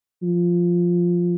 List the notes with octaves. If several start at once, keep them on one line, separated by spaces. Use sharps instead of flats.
F3